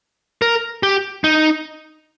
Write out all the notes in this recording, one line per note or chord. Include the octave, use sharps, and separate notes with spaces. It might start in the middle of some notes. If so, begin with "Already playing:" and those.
A#4
G4
D#4